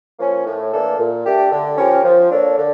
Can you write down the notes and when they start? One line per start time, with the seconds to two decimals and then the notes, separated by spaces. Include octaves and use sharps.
0.19 F3 A#3 C#4
0.45 A2
0.71 E3 A#3 D4 A4
0.98 A#2
1.24 A3 D4 G4
1.51 D3
1.77 F3 C#4 G4 A#4
2.03 F3
2.30 A#3 D4 A4 C#5
2.57 D3